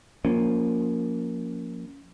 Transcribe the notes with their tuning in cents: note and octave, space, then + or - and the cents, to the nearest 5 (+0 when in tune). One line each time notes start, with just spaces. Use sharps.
F3 +15 A#3 +0 C#4 +25